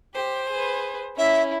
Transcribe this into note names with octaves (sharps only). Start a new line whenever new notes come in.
G4 C5
G#4 B4
C#4 E4 E5